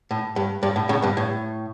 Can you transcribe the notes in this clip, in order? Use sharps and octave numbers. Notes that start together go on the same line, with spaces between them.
A2
G2
G2
A2
A2 C#3
G2 B2
A2